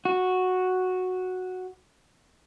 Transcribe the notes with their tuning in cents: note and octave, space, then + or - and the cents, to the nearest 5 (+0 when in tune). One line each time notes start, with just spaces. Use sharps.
F#4 -5